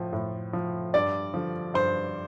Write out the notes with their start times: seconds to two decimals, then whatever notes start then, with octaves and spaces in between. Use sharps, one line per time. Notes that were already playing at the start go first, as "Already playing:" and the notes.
Already playing: A2 F3
0.13 A2
0.53 F3
0.94 G2 D5
1.34 D3 F3
1.74 G2 C5